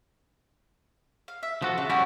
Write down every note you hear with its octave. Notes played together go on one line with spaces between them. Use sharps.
F5
E5
F3 B3 F#4 A4
C#3 D4 E5
G3 C#4 E4 F#4 C#5 G#5